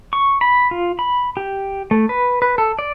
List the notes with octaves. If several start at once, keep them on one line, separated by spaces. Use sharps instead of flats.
C#6
B5
F4
B5
G4
A3
B4
B4
A4
D5